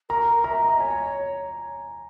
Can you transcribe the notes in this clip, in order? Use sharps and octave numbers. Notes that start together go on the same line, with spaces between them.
A#4 A#5
A#4
E5 A#5
D#5
A#5
C#5 G#5